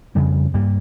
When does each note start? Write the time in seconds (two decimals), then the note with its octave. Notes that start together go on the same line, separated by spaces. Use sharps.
0.15 F2 C#3 G3 C4
0.54 G2 G3 A#3